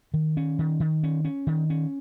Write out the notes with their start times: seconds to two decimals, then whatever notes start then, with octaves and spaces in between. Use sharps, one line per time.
0.14 D#3
0.37 C#4
0.59 D#3
0.80 D#3
1.03 C#4
1.25 C#4
1.47 D#3
1.70 C#4